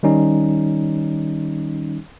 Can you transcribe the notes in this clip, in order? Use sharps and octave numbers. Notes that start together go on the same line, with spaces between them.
D#3 G3 C#4 D#4